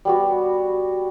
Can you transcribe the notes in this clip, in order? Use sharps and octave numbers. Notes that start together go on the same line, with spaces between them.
G3 B3 F#4